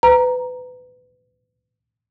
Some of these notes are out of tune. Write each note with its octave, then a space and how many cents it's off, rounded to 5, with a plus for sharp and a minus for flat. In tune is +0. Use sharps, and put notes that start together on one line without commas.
B4 +25 A#5 +0